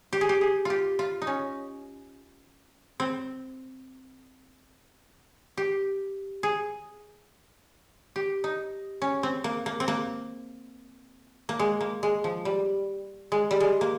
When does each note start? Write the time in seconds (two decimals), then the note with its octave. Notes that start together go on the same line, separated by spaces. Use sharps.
0.13 G4
0.21 G#4
0.29 G4
0.41 G#4
0.65 F4 G4
0.99 F4
1.22 D#4
1.27 C#4
3.00 C4
5.57 G4
6.43 G#4
8.16 G4
8.44 D#4
9.02 C#4
9.23 C4
9.44 A#3
9.66 A#3
9.80 C4
9.88 A#3
11.49 A#3
11.59 G#3
11.81 A#3
12.03 G#3
12.24 F3
12.45 G3
13.32 G#3
13.51 G3
13.60 G#3
13.81 A#3